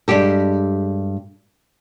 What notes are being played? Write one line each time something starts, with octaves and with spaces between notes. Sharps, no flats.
G2 G#3 G4 A4